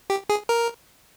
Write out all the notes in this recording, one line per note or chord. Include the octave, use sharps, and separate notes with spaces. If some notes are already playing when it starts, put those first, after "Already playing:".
G4
G#4
A#4